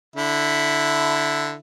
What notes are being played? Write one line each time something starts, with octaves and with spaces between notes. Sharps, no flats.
D3 E4